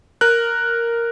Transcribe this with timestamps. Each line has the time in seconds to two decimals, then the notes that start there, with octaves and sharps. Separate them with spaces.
0.21 A#4 F#6